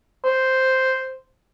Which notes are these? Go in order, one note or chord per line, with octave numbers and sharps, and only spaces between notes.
C5